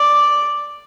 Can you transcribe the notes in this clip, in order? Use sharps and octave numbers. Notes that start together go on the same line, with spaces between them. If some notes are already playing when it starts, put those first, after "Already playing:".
Already playing: D5